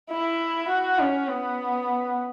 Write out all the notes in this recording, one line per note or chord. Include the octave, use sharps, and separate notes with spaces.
E4
F#4
C#4
B3